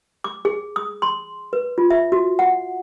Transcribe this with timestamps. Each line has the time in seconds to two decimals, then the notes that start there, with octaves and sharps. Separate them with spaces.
0.24 D6
0.45 G#4
0.76 D#6
1.02 C6
1.53 B4
1.78 F4
1.91 E5
2.12 F#4
2.39 F#5